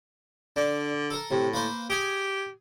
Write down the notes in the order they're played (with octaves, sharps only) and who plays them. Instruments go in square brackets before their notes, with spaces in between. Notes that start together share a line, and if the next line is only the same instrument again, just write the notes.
[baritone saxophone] D3 [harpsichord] D4
[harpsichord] A4 A#4
[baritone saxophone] A2 [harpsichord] C3
[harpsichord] A#3 B4 C5
[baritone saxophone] G4 [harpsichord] G#4 G#5